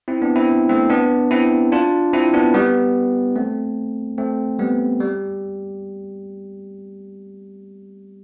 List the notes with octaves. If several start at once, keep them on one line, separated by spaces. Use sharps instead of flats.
C4 E4
B3 D4
C4 E4
A3 C4
B3 D4
C4 E4
D4 F4
C4 E4
B3 D4
G3 B3
A3 C4
A3 C4
G3 B3
G3